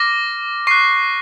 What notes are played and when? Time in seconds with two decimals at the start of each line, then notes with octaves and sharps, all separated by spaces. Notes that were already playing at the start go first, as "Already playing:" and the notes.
Already playing: D6 F6 A#6
0.67 C#6 F#6 C7